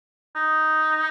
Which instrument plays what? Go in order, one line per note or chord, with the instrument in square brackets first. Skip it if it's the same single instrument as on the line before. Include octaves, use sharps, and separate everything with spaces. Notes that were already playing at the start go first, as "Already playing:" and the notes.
[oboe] D#4